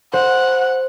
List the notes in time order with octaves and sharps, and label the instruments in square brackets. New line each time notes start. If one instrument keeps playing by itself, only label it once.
[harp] C5 [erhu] F#5